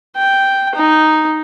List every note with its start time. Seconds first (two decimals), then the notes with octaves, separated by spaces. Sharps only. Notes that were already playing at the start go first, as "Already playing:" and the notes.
0.17 G5
0.75 D#4